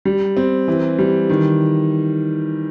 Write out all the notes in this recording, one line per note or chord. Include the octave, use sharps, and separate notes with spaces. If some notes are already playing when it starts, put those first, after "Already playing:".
G3
C4
E3
G3
D#3